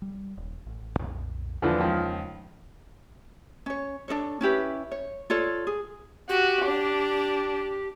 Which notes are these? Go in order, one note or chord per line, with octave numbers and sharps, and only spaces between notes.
G3
D#1
A1
B1 F2 A#2
E2 D3 E3 F3 A#3
C#2 D#3 F3
C#4 C#5
D4 D#4 A4 C#5
C#4 E4 G4 B4
C#5
F4 A4 C#5 D5
G#4
F#4 G4
D4